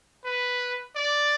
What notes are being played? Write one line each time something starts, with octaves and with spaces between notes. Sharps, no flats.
B4
D5